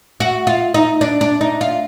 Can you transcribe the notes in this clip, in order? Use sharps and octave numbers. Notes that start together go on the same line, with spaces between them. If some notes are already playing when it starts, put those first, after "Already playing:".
F#4
F4
D#4
D4
D4
D#4
F4